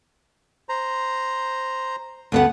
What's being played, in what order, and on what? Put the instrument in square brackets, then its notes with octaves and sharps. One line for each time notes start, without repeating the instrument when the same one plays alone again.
[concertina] C5 A#5
[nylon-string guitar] D2 B3 F#5